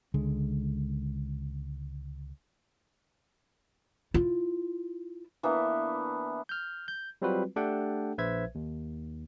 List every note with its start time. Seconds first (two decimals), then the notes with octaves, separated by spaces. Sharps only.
0.14 C#2 D3 G#3
4.14 E4 F4
5.43 E3 A#3 B3 D4
6.49 F6 G6
6.88 G6
7.22 F#3 G3 C4 F4 F#4 B4
7.56 A3 D4 G4 A4 F#5 G5
8.18 A#1 B4 C5 E5 G#6
8.55 D#2